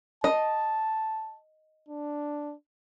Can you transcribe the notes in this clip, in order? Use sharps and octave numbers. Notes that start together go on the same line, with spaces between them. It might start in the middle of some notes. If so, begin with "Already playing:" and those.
D#5 A5
D4